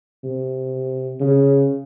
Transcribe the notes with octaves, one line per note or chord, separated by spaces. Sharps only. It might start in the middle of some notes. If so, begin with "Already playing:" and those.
C3
C#3